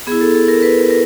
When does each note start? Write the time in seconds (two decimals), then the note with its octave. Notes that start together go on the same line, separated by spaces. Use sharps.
0.07 B3 E4 G#4
0.21 A4
0.34 A4
0.48 A#4
0.63 B4
0.90 A#4